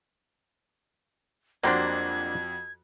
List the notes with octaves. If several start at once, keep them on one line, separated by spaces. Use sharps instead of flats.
F2 F#3 G3 A#3 D4 F#4 C5 G#6